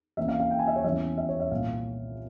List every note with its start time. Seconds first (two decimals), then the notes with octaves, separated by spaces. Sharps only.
0.17 C3 E3 A#3 C#4 E5
0.28 F5
0.40 F5
0.50 G5
0.59 G#5
0.68 E5
0.76 C#5
0.84 E2 E3 G3 C#4 E5
1.18 E5
1.29 C#5
1.40 E5
1.51 C2 A#2 G3 C4 F5